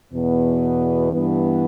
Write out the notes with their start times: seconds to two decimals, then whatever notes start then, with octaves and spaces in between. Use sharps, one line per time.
0.12 E2 B2 B3
1.11 G2 E3 B3